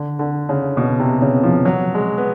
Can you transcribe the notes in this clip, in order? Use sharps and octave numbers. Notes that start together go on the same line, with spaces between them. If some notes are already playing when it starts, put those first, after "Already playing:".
Already playing: D3
D3
C#3
B2
C3
C#3
F3
F#3
G#3
B3